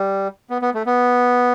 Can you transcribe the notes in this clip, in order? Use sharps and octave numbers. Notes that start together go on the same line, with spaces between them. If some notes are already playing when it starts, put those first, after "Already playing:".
Already playing: G3
B3
B3
A3
B3